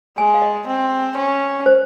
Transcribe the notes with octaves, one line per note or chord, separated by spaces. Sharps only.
G#3 G#5
F5
D#5
C4
C#4
C5